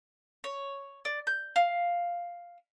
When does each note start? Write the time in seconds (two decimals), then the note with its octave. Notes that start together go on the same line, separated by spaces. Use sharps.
0.44 C#5
1.05 D5
1.27 G6
1.56 F5